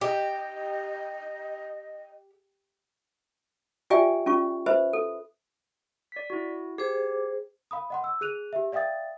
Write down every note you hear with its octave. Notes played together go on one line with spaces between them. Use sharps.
G4 D#5
F4 G4 D5 E5 G5 G#5
C#4 F4 C#6
B4 C5 E5 B5
A4
D5 B6
E4 F#4
G4 G#4 C5
F5 B5 D#6
D#5 F#5 C6
E6
G#4 F#6 D#7 F7
G4 E5
D5 E5 F5 G5 D#6 A6